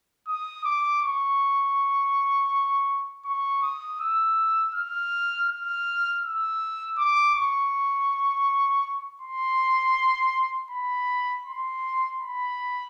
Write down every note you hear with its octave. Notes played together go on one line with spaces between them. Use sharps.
D#6
D6
C#6
C#6
D#6
E6
F6
F6
E6
D6
C#6
C6
B5
C6
B5